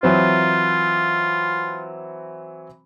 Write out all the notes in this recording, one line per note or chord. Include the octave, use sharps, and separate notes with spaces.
E3 F#3 C4 F4